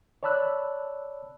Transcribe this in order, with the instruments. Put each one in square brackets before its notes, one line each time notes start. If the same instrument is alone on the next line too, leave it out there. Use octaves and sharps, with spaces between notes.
[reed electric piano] C#5 D5 A5 B5 E6 F#6